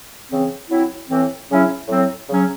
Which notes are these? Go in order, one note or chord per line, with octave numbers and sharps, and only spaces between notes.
C#3 E3 C4
F#3 C4 E4
A2 E3 C4
C#3 F#3 C#4 E4
A2 F#3 C4
C#3 F#3 C#4